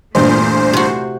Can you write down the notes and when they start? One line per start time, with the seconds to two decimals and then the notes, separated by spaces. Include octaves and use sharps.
0.15 E2 G2 A#2 A3 C5
0.73 C3 F#4